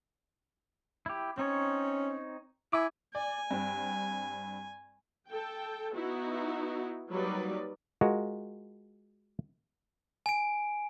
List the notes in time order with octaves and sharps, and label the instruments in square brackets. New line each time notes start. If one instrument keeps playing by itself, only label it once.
[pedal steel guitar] E4 G4
[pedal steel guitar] C4 D#4 C#5 [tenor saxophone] C#4
[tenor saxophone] E4 [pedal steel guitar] G#5 D6
[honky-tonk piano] D5 [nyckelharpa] G#5
[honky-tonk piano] G2 C4 G5
[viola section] A4 G5
B3 D#4 E4 F#4
F#3 G3 A#3 D#4 B4 D5
[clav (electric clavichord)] G#3 F4 F#4 A#4
[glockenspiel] G#5 D7